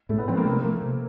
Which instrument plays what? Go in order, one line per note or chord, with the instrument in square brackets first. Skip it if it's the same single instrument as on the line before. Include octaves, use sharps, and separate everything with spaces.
[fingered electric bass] A2 [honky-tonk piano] A3
[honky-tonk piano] B3
[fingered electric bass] F3 A3 [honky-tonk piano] C4
[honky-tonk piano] A#3
[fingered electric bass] C3 [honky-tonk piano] A3
[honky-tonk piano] A#3
[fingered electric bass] F3 A3
C3